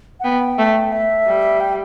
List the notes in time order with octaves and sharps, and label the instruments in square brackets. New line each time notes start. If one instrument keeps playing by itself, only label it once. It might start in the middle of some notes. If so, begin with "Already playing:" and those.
[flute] F#5
[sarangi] B3 [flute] G5
[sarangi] A3
[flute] E5
[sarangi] G3
[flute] G5